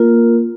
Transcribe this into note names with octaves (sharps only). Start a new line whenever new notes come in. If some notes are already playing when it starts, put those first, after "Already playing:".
Already playing: A#3 F4 A#4